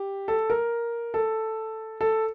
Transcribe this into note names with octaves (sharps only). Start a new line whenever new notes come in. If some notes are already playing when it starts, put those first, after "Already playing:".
Already playing: G4
A4
A#4
A4
A4